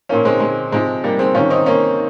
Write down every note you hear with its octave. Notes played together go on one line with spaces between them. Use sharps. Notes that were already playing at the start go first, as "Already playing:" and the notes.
A#2 F3 A#3 C#4
G#3 C4
G#3
C3 F3 G#3
G3 A#3
G#3 C4
C3 D#3 C#4 F4
C4 D#4
A#3 C#4